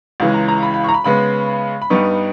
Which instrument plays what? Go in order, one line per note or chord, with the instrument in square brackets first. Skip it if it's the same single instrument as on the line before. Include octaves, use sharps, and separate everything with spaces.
[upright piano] C#2 C#3 E3 G#3
A#5
A#5
B5
B5
A#5 C#6
B5
C#3 G#3 B3 B5
B5
G2 G3 B3 D#4 C#6